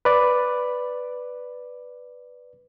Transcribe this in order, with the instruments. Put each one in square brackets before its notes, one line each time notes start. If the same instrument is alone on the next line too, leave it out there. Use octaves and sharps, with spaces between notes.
[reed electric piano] B4 D5